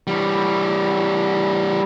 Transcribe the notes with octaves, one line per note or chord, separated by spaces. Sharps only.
E3 G3